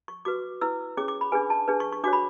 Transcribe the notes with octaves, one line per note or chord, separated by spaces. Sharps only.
C#6
F#4 B4 D6
E4 B4 E6
C#4 G#4 C#5 D6
D6
B5
D4 G#4 B4 G#5
A5
D4 G#4 B4
C#6
C#6
D4 F#4 C#5 D6
B5